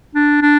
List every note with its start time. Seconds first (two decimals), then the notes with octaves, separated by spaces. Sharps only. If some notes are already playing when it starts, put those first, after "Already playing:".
0.15 D4
0.42 D4